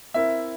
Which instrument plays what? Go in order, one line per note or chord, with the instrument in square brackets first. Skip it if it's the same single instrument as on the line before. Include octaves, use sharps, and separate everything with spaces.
[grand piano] C4 E4 A#4 [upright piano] E5